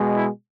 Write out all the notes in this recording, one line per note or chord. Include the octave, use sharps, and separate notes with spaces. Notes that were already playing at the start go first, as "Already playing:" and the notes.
Already playing: B2 G#3
E4